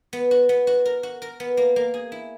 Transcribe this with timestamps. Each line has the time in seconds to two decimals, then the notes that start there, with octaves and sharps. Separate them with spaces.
0.13 B3
0.31 F#4
0.49 B3
0.67 F#4
0.85 A#4
1.03 F#4
1.22 A#4
1.40 B3
1.57 A#3
1.76 A#3
1.94 G#4
2.12 E4